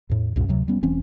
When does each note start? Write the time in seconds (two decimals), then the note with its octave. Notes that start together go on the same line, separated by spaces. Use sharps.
0.10 E2 A2
0.36 C2 F#2 A#2
0.49 D2 C3 F#3
0.68 G3 B3 C#4
0.83 E1 E3 C4 C#4